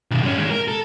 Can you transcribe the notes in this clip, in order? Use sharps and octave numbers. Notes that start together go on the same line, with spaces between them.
B1 D#3
G2 C#4
D#3 G#3
A#4
A4